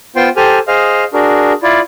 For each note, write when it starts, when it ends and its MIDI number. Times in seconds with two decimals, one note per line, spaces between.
0.16 0.29 59
0.16 0.29 65
0.16 0.29 72
0.16 0.29 79
0.16 0.29 84
0.37 0.59 67
0.37 0.59 69
0.37 0.59 72
0.37 0.59 80
0.37 0.59 89
0.68 1.04 68
0.68 1.04 72
0.68 1.04 75
0.68 1.04 77
0.68 1.04 89
1.13 1.53 62
1.13 1.53 66
1.13 1.53 68
1.13 1.53 70
1.63 1.80 64
1.63 1.80 65
1.63 1.80 74